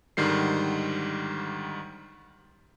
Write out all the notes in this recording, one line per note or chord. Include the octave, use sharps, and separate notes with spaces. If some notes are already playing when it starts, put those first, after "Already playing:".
G#2 D3 D#3 G3 C7